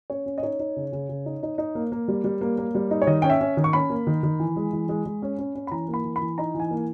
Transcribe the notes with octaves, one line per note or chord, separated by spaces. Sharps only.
C#4 C#5
C#4
D#5
D#4 C#5
D#4
C#3
C#3
C#3
D#4
D#4
D#4
A#3
A#3
G3
G3
A#3
A#3
G3
D#4
C#5
D#3 D#5
C#4 G5
E5
C#4
D#3
C#6
C#4 B5
A#3
D#3
D#3
E3
G#3
E3
G#3
G#3
C#4
C#4
C#4
B5
E3 A#5
A#3
B5
E3
B5
E3
D#4 A#5
E3
G#5
A#3